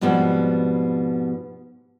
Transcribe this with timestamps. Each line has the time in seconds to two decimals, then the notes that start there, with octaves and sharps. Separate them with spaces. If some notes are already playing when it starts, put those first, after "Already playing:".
0.01 G#2 B2 F3 G3 B3 C4